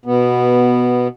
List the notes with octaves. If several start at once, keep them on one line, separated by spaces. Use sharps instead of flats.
B2 B3